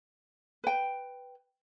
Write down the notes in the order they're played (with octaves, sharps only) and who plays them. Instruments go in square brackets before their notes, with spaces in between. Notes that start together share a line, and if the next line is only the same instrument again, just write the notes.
[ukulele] B4 G5